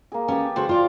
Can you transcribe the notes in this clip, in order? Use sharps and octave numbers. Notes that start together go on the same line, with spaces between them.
A#3 G#4
C#4 G4 B4 A5
C#3 F#4 G4 A4 C5
F4 C5 D5 F5